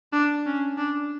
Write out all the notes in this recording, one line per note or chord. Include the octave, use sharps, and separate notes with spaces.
D4
C#4
D4